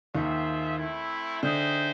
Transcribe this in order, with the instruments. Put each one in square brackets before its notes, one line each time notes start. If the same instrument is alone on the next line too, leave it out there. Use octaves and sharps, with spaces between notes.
[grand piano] D#2 D#3 [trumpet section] F4 G#4 C5 E5
[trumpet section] A3 C4 E4
[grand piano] D3 [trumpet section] D#4 G#4 C5 E5 G5